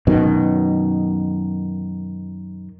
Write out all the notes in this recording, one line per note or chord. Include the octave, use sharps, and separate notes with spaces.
F#2 B2 D#3